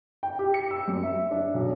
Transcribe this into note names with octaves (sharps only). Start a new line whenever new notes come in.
G5
G4
C#7
E6
F#2
E5
D4
B1